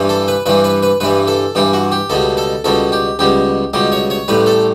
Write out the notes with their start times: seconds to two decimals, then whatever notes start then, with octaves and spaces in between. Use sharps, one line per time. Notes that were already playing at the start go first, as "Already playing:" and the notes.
Already playing: G2 E3 G3
0.09 A4
0.28 B4
0.46 G2 E3 G3 B4
0.64 B4
0.83 B4
1.00 G2 E3 G3 B4
1.27 A4
1.55 G2 E3 G3 G4
1.73 F#4
1.92 G4
2.10 C#2 B2 G3 A4
2.37 A4
2.64 C#2 B2 G3 A4
2.92 G4
3.19 C#2 B2 G3 G4
3.73 C#2 B2 G3 G4
3.92 C#5
4.10 C#5
4.28 A1 A2 G3 B4
4.46 A4